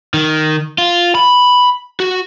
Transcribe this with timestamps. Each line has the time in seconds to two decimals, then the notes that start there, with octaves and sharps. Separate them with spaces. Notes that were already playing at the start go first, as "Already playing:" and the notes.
0.14 D#3
0.78 F4
1.15 B5
2.00 F#4